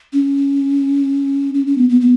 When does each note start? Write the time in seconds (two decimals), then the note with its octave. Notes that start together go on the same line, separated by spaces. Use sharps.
0.13 C#4
1.54 C#4
1.67 C#4
1.78 B3
1.89 B3
2.01 B3